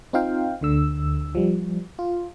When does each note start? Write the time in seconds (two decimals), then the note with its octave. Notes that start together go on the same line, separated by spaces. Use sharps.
0.13 C4 D#4 F4 F5 G5
0.61 D2 D3 E6
1.35 F3 G3
1.99 F4